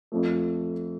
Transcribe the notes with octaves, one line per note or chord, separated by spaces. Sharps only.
F2 F3 A3